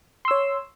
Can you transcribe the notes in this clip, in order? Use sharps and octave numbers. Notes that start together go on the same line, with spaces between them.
C#5 C6 E6